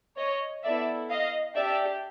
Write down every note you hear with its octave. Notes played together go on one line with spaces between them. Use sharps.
C#5 D#5
B3 E4 A4 D5 E5
D#5 F5
D4 G4 D5 E5